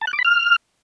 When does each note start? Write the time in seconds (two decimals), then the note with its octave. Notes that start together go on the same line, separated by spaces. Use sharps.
0.01 A5
0.07 F#6
0.13 D6
0.19 B5
0.25 F6